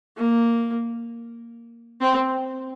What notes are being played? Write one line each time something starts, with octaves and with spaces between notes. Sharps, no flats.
A#3
C4